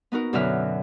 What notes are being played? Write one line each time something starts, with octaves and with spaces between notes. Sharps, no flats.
B3 D#4 F#4 A#4
F#2 B2 D3 F#3 E5 F6